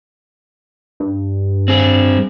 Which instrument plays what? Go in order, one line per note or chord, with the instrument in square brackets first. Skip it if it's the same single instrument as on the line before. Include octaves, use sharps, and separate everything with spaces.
[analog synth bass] G2
[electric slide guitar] C4 G#4